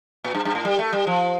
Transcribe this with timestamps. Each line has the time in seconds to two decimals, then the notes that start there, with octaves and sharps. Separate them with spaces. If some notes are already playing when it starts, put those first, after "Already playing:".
0.24 A#2
0.35 G2
0.45 G2
0.55 A2
0.65 G3
0.79 A3
0.93 G3
1.07 F3